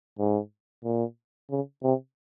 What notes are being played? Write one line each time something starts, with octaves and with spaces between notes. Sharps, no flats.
G#2
A#2
C#3
C3